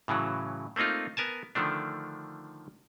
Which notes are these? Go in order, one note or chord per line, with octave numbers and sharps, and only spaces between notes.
A2 C#3 E3 F#3
A3 A#3 C4 D#4 F4
B3 A#4 G#5 A5
D3 D#3 F3 A3 D4